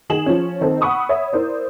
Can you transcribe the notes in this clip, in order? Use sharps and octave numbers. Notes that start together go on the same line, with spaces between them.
D#3 G#4 E7 F#7
F3 C#4
D#3 C4 D#4 A4
F#5 B5 C#6 D#6 E6
C#5 E5 B5
E4 A#4 C5 D5